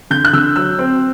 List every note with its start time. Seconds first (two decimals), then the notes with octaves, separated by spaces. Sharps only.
0.10 D3 G6
0.25 F#6
0.33 D3 E6
0.56 F#3 E6
0.78 C4